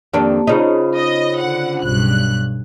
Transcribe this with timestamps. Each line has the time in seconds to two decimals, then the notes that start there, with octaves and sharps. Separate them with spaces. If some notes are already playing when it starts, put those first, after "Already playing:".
0.13 F2 D#3 A#3 D4 G4
0.47 C#3 D#4 F4 C5 B5
0.96 D#5
1.39 D3 F#5
1.83 B1 G2 F#6